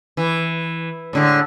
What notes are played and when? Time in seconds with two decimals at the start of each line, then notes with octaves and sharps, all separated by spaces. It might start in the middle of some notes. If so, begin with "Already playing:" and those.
0.17 E3
1.13 A2 D3 G#3